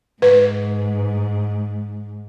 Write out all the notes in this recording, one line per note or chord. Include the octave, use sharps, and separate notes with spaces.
G#2 B4